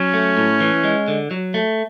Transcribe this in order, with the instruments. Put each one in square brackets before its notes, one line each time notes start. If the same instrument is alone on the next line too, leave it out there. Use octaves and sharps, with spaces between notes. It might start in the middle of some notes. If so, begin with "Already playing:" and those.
Already playing: [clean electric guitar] F#3 [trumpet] C#4
[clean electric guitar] A3
A2
E3
G#3
D3
F#3
A3